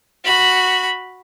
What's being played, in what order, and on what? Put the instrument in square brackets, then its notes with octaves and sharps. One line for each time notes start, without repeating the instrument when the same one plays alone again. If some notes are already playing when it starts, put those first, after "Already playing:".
[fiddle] F#4 B5